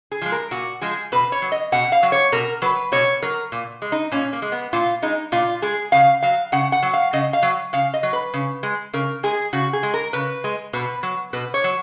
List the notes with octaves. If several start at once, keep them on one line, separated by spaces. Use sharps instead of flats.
G#4
F3 G#3
A#4
A#2 F#4
F3 G#3 G#4
B2 B4
C#5
F#3
D#5
B2 F#5
F5
F#3
C#5
B2 A#4
F#3 B4
B2 C#5
F#3 A#4
A#2
G#3
D#4
A#2 C#4
A#3
G#3
B3
A#2 F4
G#3 D#4
A#2 F4
G#3 G#4
C#3 F5
F#3 F5
C#3 F#5
F#5
F#3
F5
C#3 D#5
F5
F#3
C#3 F5
D#5
F#3
B4
C#3
G#3
C#3 A#4
G#3 G#4
C#3 F#4
G#4
G#3
A#4
C#3 B4
G#3
B2 B4
F#3
B2 B4
C#5
F#3